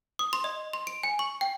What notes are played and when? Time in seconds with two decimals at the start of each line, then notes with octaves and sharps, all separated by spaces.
0.19 D#6
0.33 C6
0.44 D#5
0.73 C6
0.87 D7
1.03 G#5
1.19 C#6
1.41 G5